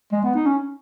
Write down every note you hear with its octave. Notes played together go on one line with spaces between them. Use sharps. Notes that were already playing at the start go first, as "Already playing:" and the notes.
G#3
B3
D#4
C#4